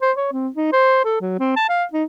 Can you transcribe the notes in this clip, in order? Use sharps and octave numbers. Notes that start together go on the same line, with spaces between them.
C5
C#5
C4
D#4
C5
A4
F#3
C4
A5
F5
D#4